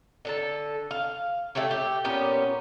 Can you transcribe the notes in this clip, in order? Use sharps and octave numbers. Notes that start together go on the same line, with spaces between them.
D3 A4 A5
F5
A3 G4 A4 C#5
G4
A#2 B3 C#4 G4